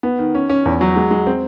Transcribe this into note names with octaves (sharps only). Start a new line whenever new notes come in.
B3
D#3
C#4
C#4
E2
F#3
G#3
G#3
C4